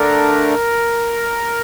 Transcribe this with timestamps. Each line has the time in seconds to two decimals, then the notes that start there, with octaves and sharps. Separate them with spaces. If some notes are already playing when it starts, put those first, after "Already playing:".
Already playing: D3 A3 D4 A#4